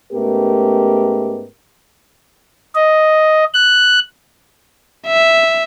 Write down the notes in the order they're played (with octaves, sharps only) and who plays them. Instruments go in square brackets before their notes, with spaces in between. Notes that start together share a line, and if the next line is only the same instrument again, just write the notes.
[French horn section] G#2 A3 B3 C#4 G4 A#4
[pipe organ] D#5
F#6
[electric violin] E5